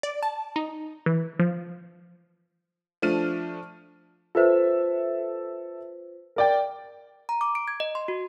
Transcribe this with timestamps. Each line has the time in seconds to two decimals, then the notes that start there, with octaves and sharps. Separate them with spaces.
0.03 D5
0.23 A5
0.56 D#4
1.06 E3
1.39 F3
3.02 F3 A3 D4 F6 D#7
4.35 F4 A4 B4 C5 E5
6.36 A#4 D5 G5
7.29 A#5
7.41 D6
7.55 D7
7.68 G#6
7.80 D#5
7.95 C6
8.08 F#4